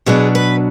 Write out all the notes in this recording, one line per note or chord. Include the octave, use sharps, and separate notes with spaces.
B2 F#3 B3 D4 G#4
B4